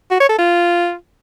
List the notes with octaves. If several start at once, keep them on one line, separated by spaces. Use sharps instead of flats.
F#4
C#5
A4
F4